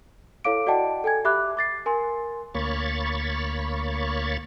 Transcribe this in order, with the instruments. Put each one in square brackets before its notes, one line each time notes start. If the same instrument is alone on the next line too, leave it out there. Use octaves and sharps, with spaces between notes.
[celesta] E4 A4 C#5 F5 D6 D7
F#4 D5 D#5 F#5 G5 A5
A4 G5 G#5 G#6
G4 E5 B5 D6 F#6
D6 A6 C7
A#4 G#5 C6
[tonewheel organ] D2 A#3 C#5 B5 C#6 A6